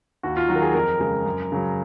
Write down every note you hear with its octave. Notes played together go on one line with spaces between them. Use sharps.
D#2 F#4
F4
D#3 F#3 F#4
A#4
G#4
F2 A#4
C#3 G#3
F#2
C#3 F#3